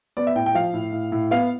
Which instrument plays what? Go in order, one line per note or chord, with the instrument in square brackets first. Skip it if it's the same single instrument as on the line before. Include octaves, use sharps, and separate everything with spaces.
[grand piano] B3 D5
E5
A2 G5
G5
F3 F5
A2
A2
A2
B3 F5